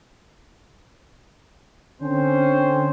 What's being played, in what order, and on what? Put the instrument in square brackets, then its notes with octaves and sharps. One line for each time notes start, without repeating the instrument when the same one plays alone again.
[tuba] D3 [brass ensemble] C4 C#4 C5